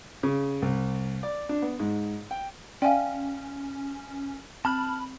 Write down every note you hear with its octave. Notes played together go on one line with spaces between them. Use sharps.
C#3
C2
D5
D4
B3
G#2
G5
C#4 D5 E5 F5 G5 G#5
C4 A5 B5 F6 F#6